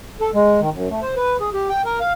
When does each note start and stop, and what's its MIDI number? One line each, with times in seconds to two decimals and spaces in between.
0.21 0.30 69
0.34 0.60 56
0.60 0.70 51
0.73 0.88 42
0.90 1.00 57
1.02 1.15 72
1.16 1.37 71
1.41 1.49 68
1.53 1.69 67
1.69 1.82 79
1.85 1.99 70
2.00 2.13 77